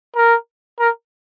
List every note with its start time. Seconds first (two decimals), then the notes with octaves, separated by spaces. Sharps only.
0.16 A#4
0.80 A#4